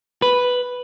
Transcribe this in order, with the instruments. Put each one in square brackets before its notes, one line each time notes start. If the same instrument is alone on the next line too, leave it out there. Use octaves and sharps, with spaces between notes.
[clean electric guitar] B4